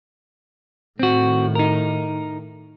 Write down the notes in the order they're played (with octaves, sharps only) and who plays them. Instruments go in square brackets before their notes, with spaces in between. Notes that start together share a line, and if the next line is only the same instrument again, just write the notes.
[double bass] A2 D#3 [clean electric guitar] C4 F#4
[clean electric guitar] D#4 A#4